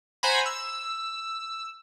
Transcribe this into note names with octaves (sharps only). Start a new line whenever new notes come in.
C5 F#5 G#5 A#5 B5
E6